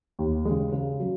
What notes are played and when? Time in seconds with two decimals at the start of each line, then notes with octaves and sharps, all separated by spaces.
0.19 D#2
0.45 G#3
0.51 C#3
0.72 C#3
1.00 F#3